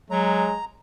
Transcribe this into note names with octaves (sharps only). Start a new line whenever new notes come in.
F#3 G#3 A#5